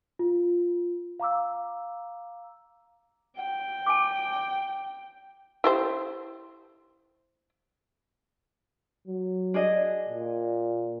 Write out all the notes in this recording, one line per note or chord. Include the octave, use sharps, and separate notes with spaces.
F4
F5 A#5 D6 E6
G5
G#5 D6
E4 G4 C5
F#3
D4 G#4 D#5
A#2